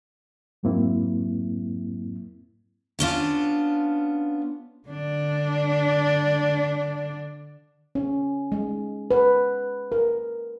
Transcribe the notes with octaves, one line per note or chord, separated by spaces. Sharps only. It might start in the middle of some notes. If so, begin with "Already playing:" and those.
F2 G#2 F#3 A#3 C4 E4
B3 C#4 D4 F4
D3 D4
C#4
G#3
B4
A#4